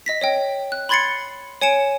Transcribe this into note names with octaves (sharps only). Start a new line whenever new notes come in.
D#5 A#6 B6
C#5 D#5 G5
F#6
B5 C6 G#6 A6 C7 C#7
C#5 G#5 C#7 D7 E7